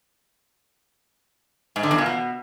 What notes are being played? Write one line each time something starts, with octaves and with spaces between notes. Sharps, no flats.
G#2
D3
E2
A#2
B2